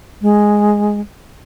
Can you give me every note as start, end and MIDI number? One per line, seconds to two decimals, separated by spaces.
0.22 1.00 56